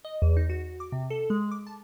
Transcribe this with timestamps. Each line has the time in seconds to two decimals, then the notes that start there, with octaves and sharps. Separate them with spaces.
0.05 D#5
0.22 E2
0.37 D#4
0.50 F#4
0.80 D6
0.92 C3
1.10 A4
1.30 G#3
1.51 D6
1.67 A5